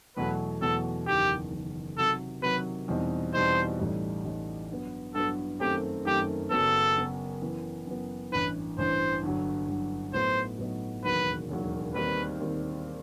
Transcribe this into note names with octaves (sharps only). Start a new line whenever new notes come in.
E2 B2 F#3 A3 B4
E2 B2 F#3 A3 A4
F#1 E2 D#3 G4
F#1 E2 D#3
C3 D#3 F#3 A4
C3 D#3 F#3 B4
E2 B2 G3 C4 D#4
E2 B2 G3 C4 D#4 C5
A1 A2 G3 D#4
A1 A2 G3 D#4
G2 F#3 B3
G2 F#3 B3 A4
F#2 D#3 A3 C4 G4
F#2 D#3 A3 C4 G4
F#1 F#2 F#3 B3 A4
F#1 F#2 F#3 B3
F#2 E3 B3
F#2 E3 B3
A1 G2 E3 B4
A1 G2 E3 C5
G1 G2 F#3
G1 G2 F#3
A2 F#3 B3 D#4 C5
A2 F#3 B3 D#4
E1 D#2 D#3 F#3 B4
E1 D#2 D#3 F#3
D#2 D#3 G3 C4 B4
D#2 D#3 G3 C4